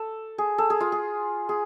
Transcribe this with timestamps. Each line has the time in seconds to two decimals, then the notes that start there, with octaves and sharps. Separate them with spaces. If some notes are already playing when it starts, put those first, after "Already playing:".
Already playing: A4
0.38 G#4
0.58 A4
0.70 G#4
0.80 F4
0.92 G#4
1.49 G#4